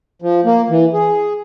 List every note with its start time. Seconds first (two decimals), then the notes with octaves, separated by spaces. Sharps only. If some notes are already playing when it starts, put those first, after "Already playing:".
0.22 F3
0.46 A#3
0.70 E3
0.94 G#4